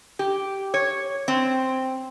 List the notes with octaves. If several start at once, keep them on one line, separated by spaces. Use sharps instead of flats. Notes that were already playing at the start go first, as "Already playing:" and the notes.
G4
C#5
C4